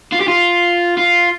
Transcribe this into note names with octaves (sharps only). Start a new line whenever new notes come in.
F4
G4
F4
F4